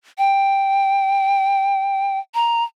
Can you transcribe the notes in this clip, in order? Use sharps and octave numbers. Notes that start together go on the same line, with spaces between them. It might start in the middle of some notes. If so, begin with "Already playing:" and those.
G5
A#5